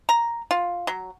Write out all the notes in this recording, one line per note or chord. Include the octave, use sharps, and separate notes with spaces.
A#5
F4
F#3